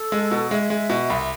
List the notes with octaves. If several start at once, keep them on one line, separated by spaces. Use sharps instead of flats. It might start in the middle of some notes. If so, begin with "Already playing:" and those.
Already playing: A4
G#3
B2
G#3 E5
G#3
B2
C2